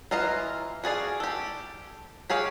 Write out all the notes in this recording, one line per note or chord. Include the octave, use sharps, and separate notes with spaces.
E3 F4 D#5 F5 A#5
F#4 G#4 D5 F5
G4 A4
G4 G#4 C#5 F5